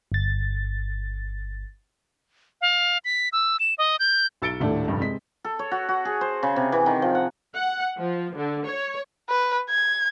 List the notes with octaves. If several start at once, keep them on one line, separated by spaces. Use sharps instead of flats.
G1 A6
F5
B6
E6
E7
D#5
G6
B1 E6 A6 C#7 D7 G7
D#1 A2 A3 D4
F1 G2
C3 G#3 B6
A4
C#5
F#4
F#4
G#4
C5
C#3
C3
E3
D#3
F3
F#5
F#5
F3
D3
C#5
B4
G#6